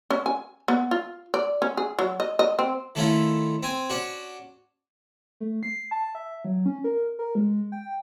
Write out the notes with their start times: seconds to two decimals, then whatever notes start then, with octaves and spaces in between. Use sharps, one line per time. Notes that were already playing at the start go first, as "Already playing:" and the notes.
0.10 C#4
0.26 G#5
0.68 B3
0.91 F4
1.34 D5
1.62 C#4
1.77 G#4
1.99 F#3
2.20 D#5
2.39 D#5
2.59 C4
2.95 D#3 A3 C#4 E4 F4
3.63 C4 G#5
3.90 C#4 D4 F#4
5.41 A3
5.63 C7
5.91 A5
6.15 E5
6.45 F#3
6.66 C#4
6.84 A#4
7.19 A#4
7.35 G#3
7.72 G5